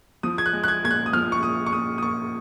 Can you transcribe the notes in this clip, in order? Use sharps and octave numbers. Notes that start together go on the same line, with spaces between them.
F3 D#6
G#6
F#6
G#3
F#6
G#6
A#2 G#6
F#6
D#6
F3 F6
C#6
A#2 D#6
C#6
A#2 D#6
D#6
A#2 C#6